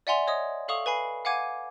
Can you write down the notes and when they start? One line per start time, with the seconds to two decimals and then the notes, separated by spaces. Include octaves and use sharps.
0.07 D5 E5 F#5 G#5 C6 F7
0.27 C#5 D#5 D#6
0.68 A4 F5 C#6 D#6 F7
0.86 B4 G#5 B5 C7
1.25 F5 F#5 G#5 D6 G#6 D#7